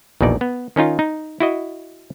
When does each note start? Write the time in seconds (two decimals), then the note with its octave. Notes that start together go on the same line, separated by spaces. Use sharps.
0.21 A#1 E2 B2 D#4 D5
0.41 B3
0.76 D#3 C#4 D#4 F4
0.99 D#4
1.40 E4 F#4 D#5